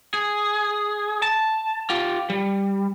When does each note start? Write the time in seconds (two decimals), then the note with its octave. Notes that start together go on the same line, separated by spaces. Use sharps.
0.14 G#4
1.22 A5
1.90 F4 G4
2.30 G3